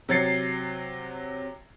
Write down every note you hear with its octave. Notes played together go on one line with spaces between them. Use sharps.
C3 F#3 G#6 A6 C7 C#7